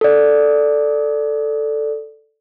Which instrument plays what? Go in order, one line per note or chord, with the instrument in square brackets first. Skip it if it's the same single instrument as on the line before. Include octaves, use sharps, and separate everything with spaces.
[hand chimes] A4 D5